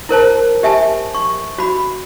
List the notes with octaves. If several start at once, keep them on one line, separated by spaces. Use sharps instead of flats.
E4 A#4 C5 A5
G4 E5 G#5 A5
C#6
F#4 B5